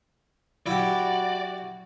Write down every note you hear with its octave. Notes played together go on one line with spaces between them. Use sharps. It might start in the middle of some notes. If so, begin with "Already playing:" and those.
F#3 E4 F#4 G4 D5 F5